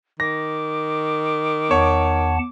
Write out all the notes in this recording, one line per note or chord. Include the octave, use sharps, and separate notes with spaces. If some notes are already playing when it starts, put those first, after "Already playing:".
D#3 D6 A#6
E2 C#5 F#5 A5